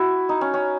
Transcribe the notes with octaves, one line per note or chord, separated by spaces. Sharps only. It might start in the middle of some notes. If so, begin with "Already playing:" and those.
Already playing: E4 F#4
D#4
C#4
C#4